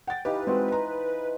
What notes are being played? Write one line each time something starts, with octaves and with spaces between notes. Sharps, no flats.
F#5 G5 A6
E3 D#4 G4 B4 F5
G#3 C4 F#4 C5
A#5
B4